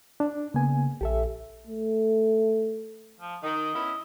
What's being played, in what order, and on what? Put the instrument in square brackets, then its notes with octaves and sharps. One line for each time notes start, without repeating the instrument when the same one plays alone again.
[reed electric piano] D4
[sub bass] C#3 [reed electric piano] A#3 B3 G#5
[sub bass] A#1 [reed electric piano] G4 A4 E5
[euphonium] A3
[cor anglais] F3
[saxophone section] D#3 [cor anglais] D#5
[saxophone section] B3 C#4 E4